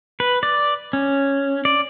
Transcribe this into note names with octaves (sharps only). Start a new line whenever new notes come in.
B4
D5
C#4
D5